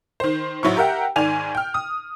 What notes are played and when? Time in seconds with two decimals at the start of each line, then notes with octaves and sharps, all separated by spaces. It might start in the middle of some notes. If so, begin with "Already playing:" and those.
0.20 D#3 C5
0.63 A1 F#3 E4 C#6
0.76 G4 A#4 E5 F#5 G5
1.16 G#2 D#3 D5 G#5 F7
1.55 G5 F6
1.74 D#6